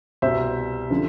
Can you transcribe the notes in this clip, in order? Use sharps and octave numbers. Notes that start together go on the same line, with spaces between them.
C2 B2 C5 E5
D3 F3